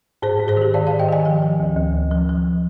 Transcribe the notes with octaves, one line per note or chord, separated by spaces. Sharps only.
G#2 G#4 C5
G#2
G#4 C5
D#3 G4
G#2 D5 F5
D5 F5
D#3
D#5 G5
D#3 F5 G#5
F3 D#5 G5
F3
D2
D2
D2
F3
F3